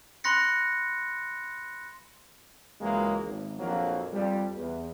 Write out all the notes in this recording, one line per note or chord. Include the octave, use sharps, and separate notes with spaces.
B5 C6 F#6 A#6 C#7
C#2 E3 F#3 G#3 A#3
G#1
A#1 F2 F3 F#3 A#3
F2 G3
E2